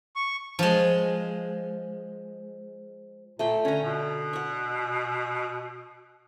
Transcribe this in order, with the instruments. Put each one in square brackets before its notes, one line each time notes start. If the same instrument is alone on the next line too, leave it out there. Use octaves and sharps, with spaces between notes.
[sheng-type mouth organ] C#6
[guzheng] F3 G#3
[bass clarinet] A#2 [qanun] A3 G5
[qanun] D3 A#5 [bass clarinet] C#4
[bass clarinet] B2
[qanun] F#5 C#6